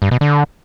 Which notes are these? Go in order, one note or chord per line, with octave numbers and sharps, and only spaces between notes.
G2
B2
D3